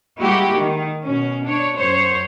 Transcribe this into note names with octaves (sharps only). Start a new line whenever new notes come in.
G3 G#3 A#3 E4 F#4 G4
D#3
B2 C#4
D4 C#5
F#2 C5 C#5